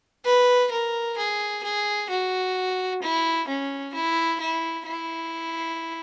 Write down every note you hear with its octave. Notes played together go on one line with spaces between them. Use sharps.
B4
A#4
G#4
G#4
F#4
E4
C#4
E4
E4
E4